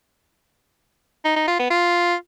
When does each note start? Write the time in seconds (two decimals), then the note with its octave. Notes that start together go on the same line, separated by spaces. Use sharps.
1.25 D#4
1.36 D#4
1.48 F4
1.59 B3
1.71 F4